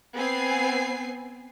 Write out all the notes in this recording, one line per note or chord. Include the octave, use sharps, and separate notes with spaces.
B3 C4 G#5 C7